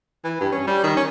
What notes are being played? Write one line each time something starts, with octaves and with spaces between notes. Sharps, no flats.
E3
G2
C#4
G3
D#3
C#4